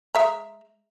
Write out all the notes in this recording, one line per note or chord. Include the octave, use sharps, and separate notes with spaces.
G#3 E5 A#5